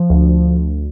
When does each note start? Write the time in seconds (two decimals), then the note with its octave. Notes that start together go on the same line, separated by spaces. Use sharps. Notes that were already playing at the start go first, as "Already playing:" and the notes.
Already playing: F3
0.10 D2